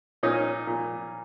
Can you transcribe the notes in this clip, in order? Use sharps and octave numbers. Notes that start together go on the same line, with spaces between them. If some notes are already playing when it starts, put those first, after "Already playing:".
A#2 C#4 D#4
A#2